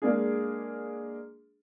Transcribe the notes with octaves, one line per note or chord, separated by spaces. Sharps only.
G#3 A#3 D4 G#4